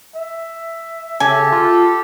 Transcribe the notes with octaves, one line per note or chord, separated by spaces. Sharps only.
E5
C#3 G4 A4 G#5
F4